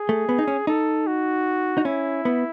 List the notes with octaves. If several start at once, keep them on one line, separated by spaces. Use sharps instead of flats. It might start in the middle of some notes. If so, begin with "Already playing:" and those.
Already playing: G#4
A3
B3
D#4
C#4
D#4 A4
F#4
D#4
C#4 E4
B3